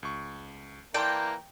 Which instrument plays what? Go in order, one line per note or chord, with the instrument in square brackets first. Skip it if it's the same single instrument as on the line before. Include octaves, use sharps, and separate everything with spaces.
[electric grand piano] C#2 C#6
[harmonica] E3 A#3 A#5 [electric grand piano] D5 A5 C6 [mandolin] G5